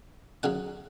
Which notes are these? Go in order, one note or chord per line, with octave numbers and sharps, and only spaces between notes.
C#3 F#3 F#5